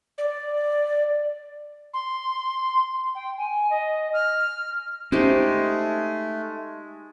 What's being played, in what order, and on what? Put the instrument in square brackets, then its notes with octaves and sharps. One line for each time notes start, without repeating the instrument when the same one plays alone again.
[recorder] D5
C6
G5
G#5
D#5
F6
[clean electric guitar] G#3 [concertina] A3 [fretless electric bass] C#4 [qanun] D#4 G4 C5